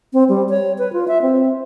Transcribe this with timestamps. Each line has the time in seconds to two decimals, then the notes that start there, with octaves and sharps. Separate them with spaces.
0.13 C4
0.29 G3
0.49 C#5
0.78 B4
0.93 F4
1.08 E5
1.22 C4